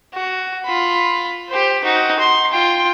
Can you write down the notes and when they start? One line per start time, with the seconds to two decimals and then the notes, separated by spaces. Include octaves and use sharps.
0.14 F#4
0.65 F4 B5
1.49 G4 C5
1.84 D#4 F#4
2.19 C6
2.51 F4 G5